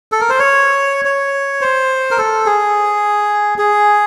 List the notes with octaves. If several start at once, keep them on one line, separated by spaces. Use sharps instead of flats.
A4
A#4
C5
C#5
C#5
C5
A#4
A4
G#4
G#4